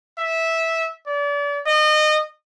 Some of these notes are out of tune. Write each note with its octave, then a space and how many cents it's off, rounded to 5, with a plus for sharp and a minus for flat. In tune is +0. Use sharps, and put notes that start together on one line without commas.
E5 -10
D5 -35
D#5 -30